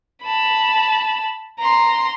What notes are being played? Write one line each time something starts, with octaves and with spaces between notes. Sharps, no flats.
A5 B5
A#5 C6